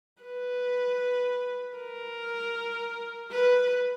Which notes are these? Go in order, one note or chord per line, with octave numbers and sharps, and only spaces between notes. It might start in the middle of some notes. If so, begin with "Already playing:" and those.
B4
A#4
B4